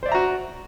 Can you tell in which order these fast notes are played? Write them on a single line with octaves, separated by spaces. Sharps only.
C5 D5 E5 A#5 F#4